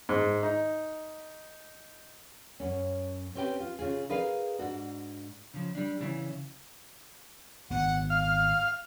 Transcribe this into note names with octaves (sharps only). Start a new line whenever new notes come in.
G#2
D#4
F#2 C#4
C4 C#4 G4 B4 G5
F4
C#3 F4 G#4
D#4 G#4 A#4 B4 D5 F5
G#2 D4 F#4
C#3 F3
G3 D4
C#3 E3
G#1 B3 F#5
F5 F6